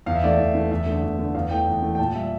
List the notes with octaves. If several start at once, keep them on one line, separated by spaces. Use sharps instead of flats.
E2 F5
E5
E3 A3 D5
E5
E2
E3 A3
E2 E5
D3 A3
E2
D3 A3
E2 F5
E3 A3 G5
E2
E3 A3
G5
A#2 A5
G3 E5